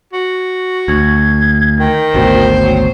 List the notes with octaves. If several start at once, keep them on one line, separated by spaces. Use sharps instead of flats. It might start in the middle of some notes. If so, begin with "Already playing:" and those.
F#4
D2 G#6
D#3 G5
G#1 D2 B2 C5
F#3